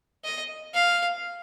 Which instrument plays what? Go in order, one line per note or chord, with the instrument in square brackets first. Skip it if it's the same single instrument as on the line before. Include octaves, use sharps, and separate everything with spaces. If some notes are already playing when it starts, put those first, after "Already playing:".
[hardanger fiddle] D#5
F5